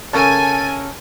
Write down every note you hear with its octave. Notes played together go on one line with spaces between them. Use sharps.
C#3 A4 A#4 G#5 A5 C#6